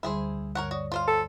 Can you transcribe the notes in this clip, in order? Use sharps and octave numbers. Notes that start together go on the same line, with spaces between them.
D2 D3 G3 E4 G#4 C5
G2 D3 A#4 C#5 F#5
F#4 C#5 D5 D#6
F4 C5 F5
A4